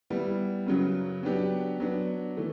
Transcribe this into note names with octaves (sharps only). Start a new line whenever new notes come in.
G3 B3 E4
F#2 C#3 F#3
F#3 B3 D4 G4
F#3 B3 D4
E3 A3